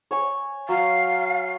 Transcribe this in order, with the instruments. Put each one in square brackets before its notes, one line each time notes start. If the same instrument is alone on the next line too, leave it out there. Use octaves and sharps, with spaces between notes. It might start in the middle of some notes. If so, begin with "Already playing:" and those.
[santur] C#5 G#5 C#6
[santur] F#3 [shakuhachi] F5